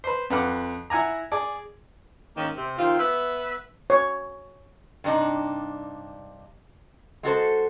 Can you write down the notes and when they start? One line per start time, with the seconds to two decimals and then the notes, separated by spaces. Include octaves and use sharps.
0.04 B4 C5
0.30 F2 B4 F#5 D6
0.90 E4 F#5 G#5 A#5
1.32 G#4 D5
2.37 G#2 D#3 A#3 C#4
2.56 C3
2.79 D#3 C4 F4
3.00 B3 B4 E5
3.90 C#5
5.04 G2 C3 D4 D#4
7.23 G#3 F#4 A4 C5